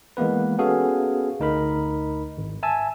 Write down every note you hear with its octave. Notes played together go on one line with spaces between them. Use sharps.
E3 G#3 A#3 B3 B4
B3 C#4 F#4 G#4 A4 F5
D2 D#4 A#4 B5
G#1
E5 G#5 A5 E6